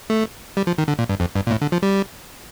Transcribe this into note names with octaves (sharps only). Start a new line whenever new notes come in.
A3
G3
F3
D#3
D3
A#2
G2
F2
G2
A#2
A2
D3
F3
G3